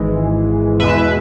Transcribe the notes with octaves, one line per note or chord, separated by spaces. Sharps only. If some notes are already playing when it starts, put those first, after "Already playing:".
Already playing: G#1 G#2 E3 G#3
E2 B2 G#3 B4 E5